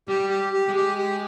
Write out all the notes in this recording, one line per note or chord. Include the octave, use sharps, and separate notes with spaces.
G3 G4
G4
G4
G#3
G4
G4